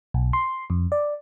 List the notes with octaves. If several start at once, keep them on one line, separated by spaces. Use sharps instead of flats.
B1
C6
F2
D5